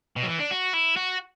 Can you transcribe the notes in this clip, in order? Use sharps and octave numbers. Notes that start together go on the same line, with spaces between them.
B2
F#3
E3
D4
F#4
E4
F#4